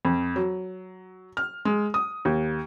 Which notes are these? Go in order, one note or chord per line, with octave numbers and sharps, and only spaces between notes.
F2
F#3
F6
G#3
D#6
D#2